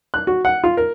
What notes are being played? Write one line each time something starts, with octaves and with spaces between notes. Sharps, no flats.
F#6
F#4
F#5
F4
A#4